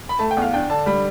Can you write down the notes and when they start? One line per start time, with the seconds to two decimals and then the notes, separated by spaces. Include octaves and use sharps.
0.09 B5
0.19 A3 A5
0.31 G5
0.37 E2 F5
0.53 D4 G5
0.70 D3 A5
0.86 G3 B5